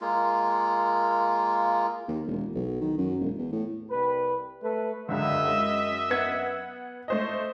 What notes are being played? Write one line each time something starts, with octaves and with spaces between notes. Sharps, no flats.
G#3 A#3 F4
D#2
E1
B1
D#3
F#2
E1
E2
A2
C2 G3 B4
A3 A4 B4
C#2 F#2 D3 D#5 E5
G#3
B3 F#5 G#6
A3 C5 D#5